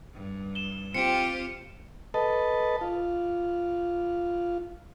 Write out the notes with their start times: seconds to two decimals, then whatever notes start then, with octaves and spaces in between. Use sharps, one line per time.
0.14 G2
0.55 E7 G7
0.94 C4 F4 G4 C#7 D7
2.14 A4 B4 D#5 A5
2.81 F4